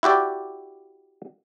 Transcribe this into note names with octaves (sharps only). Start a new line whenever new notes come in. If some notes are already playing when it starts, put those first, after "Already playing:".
E4 F#4 G4 D5